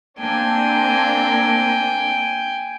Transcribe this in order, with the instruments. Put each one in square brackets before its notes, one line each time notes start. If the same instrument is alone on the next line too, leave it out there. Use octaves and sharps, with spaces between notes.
[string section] A#3 C4 D4 [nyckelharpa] G5 G#5